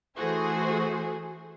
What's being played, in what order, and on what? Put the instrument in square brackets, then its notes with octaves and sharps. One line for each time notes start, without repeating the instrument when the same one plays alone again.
[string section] E3 A3 F#4 G#4 C5